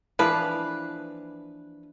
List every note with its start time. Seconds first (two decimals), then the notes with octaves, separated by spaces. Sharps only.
0.19 E3 F3 A#3 D4 B4 F5